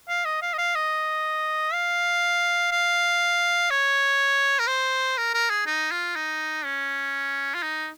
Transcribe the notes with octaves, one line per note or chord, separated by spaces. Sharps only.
F5
D#5
F5
D#5
F5
D#5
F5
F5
C#5
A#4
C5
A#4
A#4
G#4
D#4
F4
D#4
C#4
F4
D#4